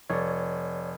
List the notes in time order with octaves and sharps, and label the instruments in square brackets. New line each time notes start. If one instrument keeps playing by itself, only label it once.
[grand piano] F1 [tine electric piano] C#5 D5